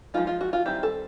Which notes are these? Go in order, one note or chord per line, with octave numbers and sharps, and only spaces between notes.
F3 G#3 B3 D#4 F4
F4
F#4
F4
D#3 G3 C4 E4 G4
A4